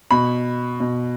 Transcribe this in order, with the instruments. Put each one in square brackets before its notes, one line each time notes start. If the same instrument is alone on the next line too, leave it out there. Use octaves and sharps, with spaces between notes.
[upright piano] B2 B5
B2